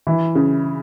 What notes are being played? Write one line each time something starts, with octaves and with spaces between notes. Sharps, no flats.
E3
C#3